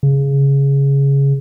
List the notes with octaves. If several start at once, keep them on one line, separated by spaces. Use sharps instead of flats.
C#3